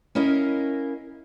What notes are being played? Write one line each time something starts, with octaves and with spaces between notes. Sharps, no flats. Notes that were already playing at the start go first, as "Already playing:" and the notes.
C#4 E4 A#4 D#5 F5